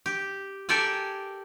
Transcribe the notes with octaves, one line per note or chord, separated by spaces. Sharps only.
G4
G4 A4 A#4 D5 G5 G#5